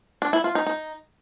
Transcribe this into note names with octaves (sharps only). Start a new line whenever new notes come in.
D4
E4
F4
D#4
D#4